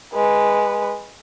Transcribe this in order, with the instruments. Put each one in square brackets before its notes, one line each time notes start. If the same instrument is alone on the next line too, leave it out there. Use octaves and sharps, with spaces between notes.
[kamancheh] G#3 B4